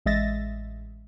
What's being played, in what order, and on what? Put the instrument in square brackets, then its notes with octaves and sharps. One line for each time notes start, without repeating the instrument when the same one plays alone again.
[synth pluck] A1 G#3 D#5 E5 A6 A#6